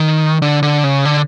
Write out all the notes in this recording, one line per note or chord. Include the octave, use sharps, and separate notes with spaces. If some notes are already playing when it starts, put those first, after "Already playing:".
Already playing: D#3
D3
D3
C#3
D3